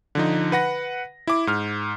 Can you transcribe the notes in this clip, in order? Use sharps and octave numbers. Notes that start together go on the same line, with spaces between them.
D3 F3 D#4
B4 F#5 A#6
E4 D6
G#2 F6